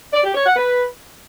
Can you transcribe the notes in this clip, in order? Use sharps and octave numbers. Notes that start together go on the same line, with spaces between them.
D5
G4
C#5
F#5
B4